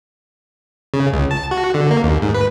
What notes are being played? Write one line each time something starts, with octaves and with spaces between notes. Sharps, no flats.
C#3
C#2
A5
F#4
D3
A#3
D#2
G#2
B4